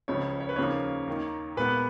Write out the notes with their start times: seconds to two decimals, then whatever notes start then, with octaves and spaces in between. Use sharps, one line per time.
0.08 C#2 C#3 F3 C#5
0.40 C#5
0.49 B4
0.56 D#2 C#3 F3 A#3 C#5
1.07 D#2 D#3 A#3
1.57 A#2 G#3 B3 B4